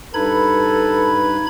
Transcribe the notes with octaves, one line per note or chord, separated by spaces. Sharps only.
G2 D#4 A4 B4 B5 G#6